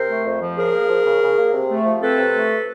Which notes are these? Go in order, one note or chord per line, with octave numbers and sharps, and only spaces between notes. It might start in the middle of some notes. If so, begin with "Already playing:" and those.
Already playing: C3 A#4 C5
A3
F2
F3
C#3 G#4 A#4
A#3
F3
C#3
C#3
A#3
C3
A3
F3
C4 A4 B4
C3
A3